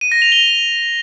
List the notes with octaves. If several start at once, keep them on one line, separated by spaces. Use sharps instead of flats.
D#7
A#6
F7
G7